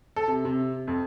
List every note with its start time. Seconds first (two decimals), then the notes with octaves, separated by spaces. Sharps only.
0.16 A4
0.28 C3
0.45 C3
0.87 F2